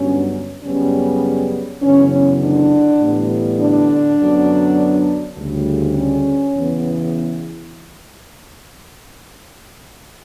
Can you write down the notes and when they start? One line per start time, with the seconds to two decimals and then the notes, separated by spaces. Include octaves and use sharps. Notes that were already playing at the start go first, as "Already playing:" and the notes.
Already playing: G2 D3 F#3 B3 C#4
0.62 F#2 C#3 G3 B3 C#4
1.81 F#2 C#3 E3 B3 C#4
2.11 C#4
2.40 D3 D4
3.00 A2 E3 G3 B3
3.58 D3 D4
4.18 F#2 D3 F#3 B3
5.36 D2 C#3 G3
5.96 C#4
6.55 E2 C#3 E3 B3